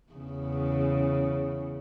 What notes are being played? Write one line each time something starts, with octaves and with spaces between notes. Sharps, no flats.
E2 C#3